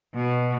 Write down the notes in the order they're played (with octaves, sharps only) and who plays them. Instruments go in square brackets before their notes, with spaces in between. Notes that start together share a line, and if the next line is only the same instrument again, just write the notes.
[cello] B2